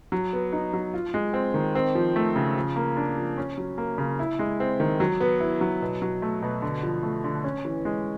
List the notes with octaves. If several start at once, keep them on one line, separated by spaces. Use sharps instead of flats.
F#3
B3
D#4
F#3
F4
G#3
C4
D#3
C4
F3
A3
C#3
F3
A#3
D4
F3
C#4
F#3
A#3
C#3
E4
G#3
C4
D#3
F#3
B3
E4
F#3
B2
F#3
A3
B2
D3
F3
A3
D3
C#4
E3
G#3